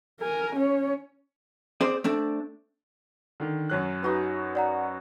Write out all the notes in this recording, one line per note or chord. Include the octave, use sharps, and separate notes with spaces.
A#4 G#5
C#4 C#5
C4 G#4 C5 D5
A3 C4 D4
D3 D#3
F#2 F#3 F#6
D#4 F#4 B4
D5 F#5 A#5